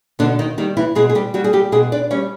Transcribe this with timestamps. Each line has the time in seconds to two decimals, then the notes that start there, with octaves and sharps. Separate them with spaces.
0.19 B2 D3 D4
0.39 D#3 D#4
0.58 D#3 G3 D#4
0.77 E3 E4
0.95 B2 G#3 G#4
1.09 G#4
1.15 G3 G4
1.34 F#3 G3 F#4
1.44 G#4
1.53 G3 G4
1.72 B2 G#3 G#4
1.92 D4 D5
2.11 G3 C#4 C#5